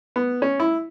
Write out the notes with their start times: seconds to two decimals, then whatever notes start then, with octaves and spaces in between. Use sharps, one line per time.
0.16 B3
0.42 C#4
0.60 E4